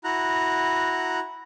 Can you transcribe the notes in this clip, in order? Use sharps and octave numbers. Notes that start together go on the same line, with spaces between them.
E4 F#4 A#5 F#6